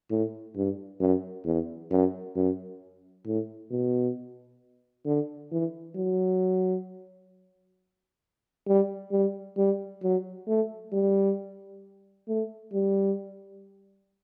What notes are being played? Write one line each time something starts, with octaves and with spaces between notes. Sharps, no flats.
A2
G2
F#2
E2
F#2
F#2
A2
B2
D3
E3
F#3
G3
G3
G3
F#3
A3
G3
A3
G3